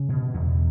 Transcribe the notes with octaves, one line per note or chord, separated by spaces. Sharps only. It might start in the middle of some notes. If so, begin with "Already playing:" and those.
Already playing: C#3
B2
E2